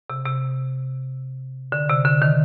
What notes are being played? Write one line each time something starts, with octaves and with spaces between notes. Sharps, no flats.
C3
C3
D3
C3
D3
D#3